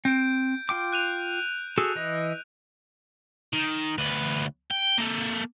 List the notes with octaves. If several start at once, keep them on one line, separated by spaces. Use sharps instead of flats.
C4 G6 D7
F4 G5 D6
F#6 D#7 F7
F#4 G#4 A4
E3 D#5
D#3
D2 B4
G5
A#3 A4